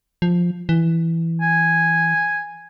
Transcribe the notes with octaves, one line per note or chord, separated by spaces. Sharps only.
F3
E3
G#5